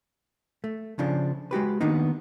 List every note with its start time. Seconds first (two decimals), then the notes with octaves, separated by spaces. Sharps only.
0.64 A3
0.99 C#3 F3 D4
1.51 G#3 F#4 G4 B4
1.81 D#3 A#3 B3 D4 D#4